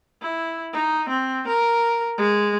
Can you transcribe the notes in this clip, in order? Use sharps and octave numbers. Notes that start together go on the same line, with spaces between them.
E4
D#4
C4
A#4
G#3